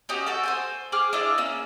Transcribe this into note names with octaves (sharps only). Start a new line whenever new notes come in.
C#4 F#4 G4 D#5
F#4 A4 G5
C5 G5 G#5
G#4 G5 D6 F6
D4 E4 F4 D#5
A#3 C#4 E6